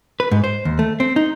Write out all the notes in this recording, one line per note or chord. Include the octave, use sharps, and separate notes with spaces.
B4
G#2
C5
D#2
A3
C4
D#4